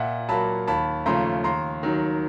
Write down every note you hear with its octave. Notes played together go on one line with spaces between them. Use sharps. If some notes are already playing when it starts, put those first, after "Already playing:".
Already playing: A#2 E5 F#5
F#3 A#3 A5 B5
D#2 A5 B5
C#3 F3 A3 A#5 C6
D#2 A#5 C6
D#3 F#3